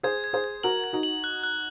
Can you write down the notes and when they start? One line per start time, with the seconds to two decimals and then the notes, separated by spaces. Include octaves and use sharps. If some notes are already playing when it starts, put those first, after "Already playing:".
0.03 G#4 C5 G#6
0.24 G#6
0.33 G#4 C5
0.44 G#6
0.63 F#4 A#4 F#7
0.84 G#6
0.93 D#4 F#4
1.03 F#7
1.24 F#6
1.43 F#6